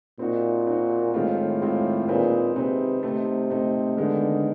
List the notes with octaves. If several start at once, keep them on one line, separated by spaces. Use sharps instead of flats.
A#2 C4 D#4 F#4
C4 D#4 F#4
A2 D#3 G#3 C4 F4
D#3 G#3 C4 F4
A#2 C4 D#4 G#4 B4
C3 C4 D#4 G#4 B4
C3 A3 C4 D#4
A3 C4 D#4
D3 D#3 G#3 B3 D#4